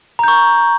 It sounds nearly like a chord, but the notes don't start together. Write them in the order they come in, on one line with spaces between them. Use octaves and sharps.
A#5 G6 C#6